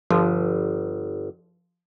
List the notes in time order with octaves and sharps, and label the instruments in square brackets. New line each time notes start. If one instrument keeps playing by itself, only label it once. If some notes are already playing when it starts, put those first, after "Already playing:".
[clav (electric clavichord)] G1 [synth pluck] F3